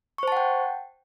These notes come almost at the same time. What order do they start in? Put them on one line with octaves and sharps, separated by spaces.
C#6 C5 A5 F#5 G5